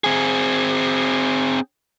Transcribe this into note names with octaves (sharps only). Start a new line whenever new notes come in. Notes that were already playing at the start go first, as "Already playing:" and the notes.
C4 G#4